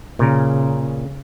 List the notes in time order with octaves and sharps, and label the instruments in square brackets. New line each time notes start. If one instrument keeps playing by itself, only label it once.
[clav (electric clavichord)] A#2 A#4 [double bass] C#3